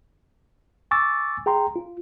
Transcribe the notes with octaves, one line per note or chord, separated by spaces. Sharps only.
G#5 C#6 D6 E6 A6
G#4 G5 A#5 C6
F4